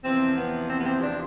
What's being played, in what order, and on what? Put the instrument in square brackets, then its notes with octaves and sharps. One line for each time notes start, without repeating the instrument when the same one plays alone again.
[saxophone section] E2 C3 F3 C4
B3
C4
B3
C4
D4